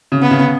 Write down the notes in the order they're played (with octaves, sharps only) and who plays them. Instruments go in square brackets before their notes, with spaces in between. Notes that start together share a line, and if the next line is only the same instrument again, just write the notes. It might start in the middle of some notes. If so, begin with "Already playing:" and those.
[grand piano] C#3
[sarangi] B3
[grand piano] C#3